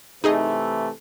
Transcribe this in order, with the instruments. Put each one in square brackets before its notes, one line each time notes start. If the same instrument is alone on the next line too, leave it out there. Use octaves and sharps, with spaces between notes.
[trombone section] C3 E3 A3 [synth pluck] D#4 G#4 D#5